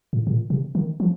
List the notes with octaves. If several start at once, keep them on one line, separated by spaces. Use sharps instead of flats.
A2
C3
A#2
C3
D#3
F3